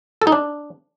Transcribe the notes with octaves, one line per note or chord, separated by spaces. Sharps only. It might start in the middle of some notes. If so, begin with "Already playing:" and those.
A4
D#4
D4